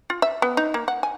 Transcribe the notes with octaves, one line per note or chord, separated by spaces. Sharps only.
F4
E5
B3
D#4
A#3
F#5
G#5